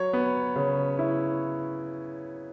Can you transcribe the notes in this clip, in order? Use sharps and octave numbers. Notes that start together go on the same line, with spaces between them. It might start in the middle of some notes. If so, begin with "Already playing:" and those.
Already playing: F#3 C#5
B3
C#3
E4